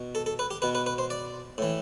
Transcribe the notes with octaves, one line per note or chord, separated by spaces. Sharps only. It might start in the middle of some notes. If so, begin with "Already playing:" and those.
Already playing: B2
A4
A4
B4
G4
B2 B4
B4
B4
C5
D5
A2 E3